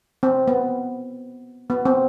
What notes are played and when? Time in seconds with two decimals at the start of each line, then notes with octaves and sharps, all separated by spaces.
0.23 C4
0.48 B3
1.70 B3
1.85 C4